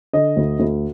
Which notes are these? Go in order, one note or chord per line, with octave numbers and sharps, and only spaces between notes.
D3 D#5
D2
D2